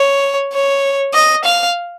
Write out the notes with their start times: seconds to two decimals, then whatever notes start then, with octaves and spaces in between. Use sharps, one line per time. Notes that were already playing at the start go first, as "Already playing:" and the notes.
Already playing: C#5
0.53 C#5
1.14 D#5
1.45 F5